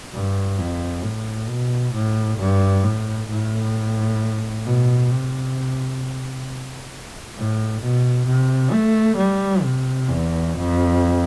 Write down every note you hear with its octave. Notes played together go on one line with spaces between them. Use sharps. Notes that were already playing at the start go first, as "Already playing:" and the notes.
G2
F2
A2
B2
A2
G2
A2
A2
B2
C3
A2
B2
C3
A3
G3
C3
E2
F2